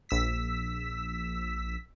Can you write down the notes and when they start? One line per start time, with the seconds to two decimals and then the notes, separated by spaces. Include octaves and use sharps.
0.09 A#1 E6 B6